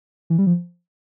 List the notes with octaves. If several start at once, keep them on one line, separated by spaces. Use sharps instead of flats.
E3
G3
F3